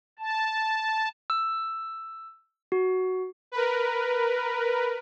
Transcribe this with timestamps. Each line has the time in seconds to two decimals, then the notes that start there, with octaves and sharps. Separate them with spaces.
0.19 A5
1.30 E6
2.72 F#4
3.52 A#4 B4